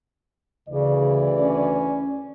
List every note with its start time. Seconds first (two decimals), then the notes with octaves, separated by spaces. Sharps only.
0.69 D2 C#3 E3 D5
1.40 C#4